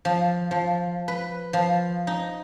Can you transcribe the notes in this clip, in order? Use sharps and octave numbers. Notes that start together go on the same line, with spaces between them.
F3
F3
B4
F3
D#4